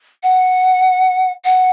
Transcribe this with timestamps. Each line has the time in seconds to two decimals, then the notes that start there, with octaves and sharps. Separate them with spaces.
0.23 F#5
1.45 F#5